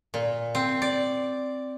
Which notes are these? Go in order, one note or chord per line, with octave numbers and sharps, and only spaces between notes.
A#2
C4
D5